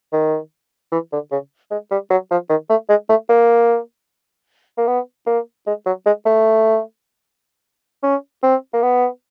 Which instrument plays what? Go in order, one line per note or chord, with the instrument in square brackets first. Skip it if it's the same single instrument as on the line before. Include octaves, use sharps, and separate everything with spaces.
[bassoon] D#3
E3
D3
C#3
G#3
G3
F#3
F3
D#3
A3
G#3
A3
A#3
A#3
B3
A#3
G#3
F#3
G#3
A3
C#4
C4
A#3
B3